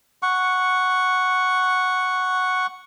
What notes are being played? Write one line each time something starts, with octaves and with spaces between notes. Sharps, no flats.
F#5 C#6